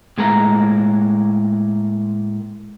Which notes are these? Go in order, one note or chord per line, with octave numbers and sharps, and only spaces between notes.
A2 G#3 A#3 A#5